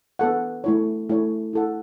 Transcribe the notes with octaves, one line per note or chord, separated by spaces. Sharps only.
B3 A4 F#5
A3 E4 C#5
A3 E4 C#5
E4 A4 F#5